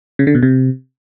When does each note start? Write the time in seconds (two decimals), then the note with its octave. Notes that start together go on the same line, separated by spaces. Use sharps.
0.19 C#3
0.27 D3
0.35 B2
0.43 C3